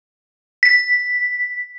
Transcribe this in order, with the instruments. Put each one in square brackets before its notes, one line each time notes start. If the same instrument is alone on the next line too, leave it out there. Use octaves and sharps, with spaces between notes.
[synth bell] B6